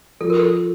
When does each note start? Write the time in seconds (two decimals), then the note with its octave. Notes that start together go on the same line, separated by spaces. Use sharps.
0.21 F3 A4
0.30 A#4
0.40 A4